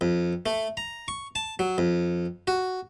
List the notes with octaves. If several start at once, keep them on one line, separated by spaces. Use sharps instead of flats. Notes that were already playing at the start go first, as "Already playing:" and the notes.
F2
A3
A#5
C#6
A5
F#3
F2
F#4